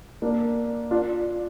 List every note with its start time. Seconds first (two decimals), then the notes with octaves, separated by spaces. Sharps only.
0.22 A#3 D4
0.91 D4 F4